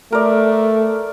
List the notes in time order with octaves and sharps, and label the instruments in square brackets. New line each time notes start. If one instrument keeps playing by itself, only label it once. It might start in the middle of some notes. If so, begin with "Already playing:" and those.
[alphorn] A3 [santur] A#4 D5